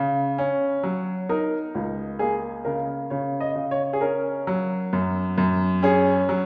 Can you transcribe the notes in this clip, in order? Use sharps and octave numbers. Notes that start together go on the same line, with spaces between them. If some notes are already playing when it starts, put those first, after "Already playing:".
Already playing: C#3
C#4
F#3
D#4 A#4
C#2
A#3 G#4
C#3 A#4
C#3 C#5
D#5
C#3
C#5
G#4
C#4 A#4
F#3
F#2
F#2
C#4 G#4
F#3